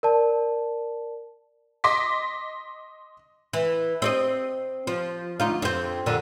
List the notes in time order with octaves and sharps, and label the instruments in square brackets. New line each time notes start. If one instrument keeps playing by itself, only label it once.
[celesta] A#4 D5 A5
[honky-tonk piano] D#5 C6 D6 B6
[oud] E3
C4 D5 D#5
F3
D2 D#4 F4
F2 C4
F2 A#2 D3